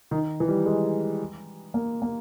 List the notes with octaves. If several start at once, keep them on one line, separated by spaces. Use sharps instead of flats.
D#3
E3
G3
G#3
A#3
A#3